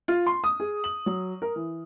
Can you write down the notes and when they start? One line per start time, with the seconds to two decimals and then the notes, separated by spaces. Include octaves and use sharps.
0.08 F4
0.26 C6
0.44 D#6
0.60 G#4
0.84 F#7
1.06 F#3
1.42 A#4
1.56 E3